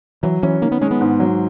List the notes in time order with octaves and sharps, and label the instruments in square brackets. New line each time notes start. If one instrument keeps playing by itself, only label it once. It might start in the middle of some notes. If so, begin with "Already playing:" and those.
[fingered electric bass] E3 [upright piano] F#3
[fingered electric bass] E3 [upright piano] C#4
[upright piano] D#3 [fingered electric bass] A#3
[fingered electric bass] B3
[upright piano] G#3 [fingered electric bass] C#4
[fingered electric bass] B3
[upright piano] G#2
F#3